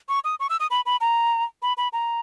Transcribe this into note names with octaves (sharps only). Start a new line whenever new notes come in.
C#6
D#6
C#6
E6
D#6
B5
B5
A#5
B5
B5
A#5